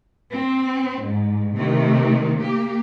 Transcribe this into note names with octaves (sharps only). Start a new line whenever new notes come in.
C4
G#2
C3 D#3 A3
A#3 G4